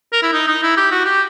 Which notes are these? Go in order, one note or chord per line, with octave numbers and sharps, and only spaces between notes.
A#4
E4
D#4
D#4
E4
G4
F#4
G4